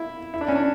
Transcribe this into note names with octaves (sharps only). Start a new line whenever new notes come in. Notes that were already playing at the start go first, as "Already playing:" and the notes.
Already playing: E4
E4
D4
C#4
D4